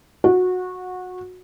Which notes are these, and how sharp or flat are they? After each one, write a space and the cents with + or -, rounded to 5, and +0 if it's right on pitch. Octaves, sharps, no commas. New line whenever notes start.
F#4 -20